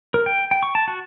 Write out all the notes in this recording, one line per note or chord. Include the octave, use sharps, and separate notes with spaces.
A#4
G5
G5
C#6
A5
F#4